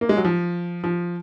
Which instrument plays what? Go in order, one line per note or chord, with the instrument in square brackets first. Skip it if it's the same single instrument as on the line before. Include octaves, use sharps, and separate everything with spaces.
[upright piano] A#3
G#3
F#3
F3
F3